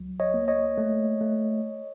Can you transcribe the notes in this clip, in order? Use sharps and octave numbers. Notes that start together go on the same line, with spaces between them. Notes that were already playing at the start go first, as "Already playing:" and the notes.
Already playing: C#2 F#3
C#5 D#5
A#3
C#5 D#5
A3
A3